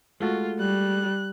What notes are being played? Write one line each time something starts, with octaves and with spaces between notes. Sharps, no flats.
G#3 A3 F4 F#4
G3 F#6